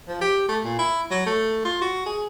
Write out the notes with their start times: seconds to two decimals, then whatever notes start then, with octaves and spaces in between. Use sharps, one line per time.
0.08 F3
0.21 G4
0.49 A3
0.64 A#2
0.79 E4
1.11 F#3
1.26 A3
1.65 F4
1.81 F#4
2.06 G#4